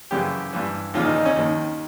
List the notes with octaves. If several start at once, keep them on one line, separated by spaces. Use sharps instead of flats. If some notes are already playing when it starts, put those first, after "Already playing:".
F#2 C#3 E3 G4
G2 E3
D#2 C#3 E3 F4
D#4
D#4
C#4
D#2 D#3